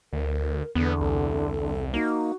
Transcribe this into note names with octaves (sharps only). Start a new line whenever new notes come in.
D2 A#4
E2 D3 B3
C2 A4
A#3 D#4 F#4